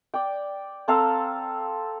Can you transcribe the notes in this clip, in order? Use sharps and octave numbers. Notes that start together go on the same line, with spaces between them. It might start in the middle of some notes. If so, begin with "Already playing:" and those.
D5 G5
C4 A4 F5 A#5